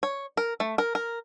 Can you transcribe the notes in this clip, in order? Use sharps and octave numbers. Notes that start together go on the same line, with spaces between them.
C#5
A#4
A3
A#4
A#4